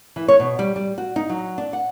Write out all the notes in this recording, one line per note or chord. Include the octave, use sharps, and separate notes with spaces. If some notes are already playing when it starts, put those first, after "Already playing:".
E3
C#5
B2
G3
G3
F#4
D#4
F#3
D4
F#5